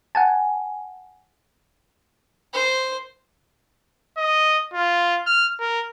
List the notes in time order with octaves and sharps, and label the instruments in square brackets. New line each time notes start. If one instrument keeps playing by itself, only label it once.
[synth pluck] F#5 G#5 A5
[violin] C5
[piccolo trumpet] D#5
F4
F6
A#4